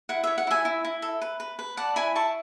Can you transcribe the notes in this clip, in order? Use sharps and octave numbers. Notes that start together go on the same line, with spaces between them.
E4 F#5
C#5 E5
F#5
E4 E5 G#5
E4
E4
A4
B4
B4
B4
D5 F#5 A5
E4 G#5 B5
E4 A5 C#6